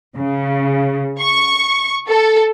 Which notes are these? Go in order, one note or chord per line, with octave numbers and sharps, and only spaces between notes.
C#3
C#6
A4